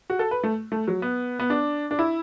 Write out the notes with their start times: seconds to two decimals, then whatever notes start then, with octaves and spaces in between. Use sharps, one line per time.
0.10 F#4
0.19 A4
0.31 B4
0.43 A3
0.72 A3
0.88 F#3
1.02 B3
1.39 B3
1.50 D4
1.91 D4
1.99 E4